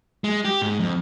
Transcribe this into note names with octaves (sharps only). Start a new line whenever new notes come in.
G#3
G4
G#2
F2